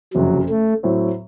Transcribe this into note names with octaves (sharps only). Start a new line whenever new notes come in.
F#1 F2 C3 F#3
A3
A2 F#3 C4